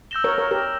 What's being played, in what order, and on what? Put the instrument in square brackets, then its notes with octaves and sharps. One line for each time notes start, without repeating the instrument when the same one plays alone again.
[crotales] E6 G6 A#6 E7 G7
[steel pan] A#4 C#5
A#4 C#5
G4 A#4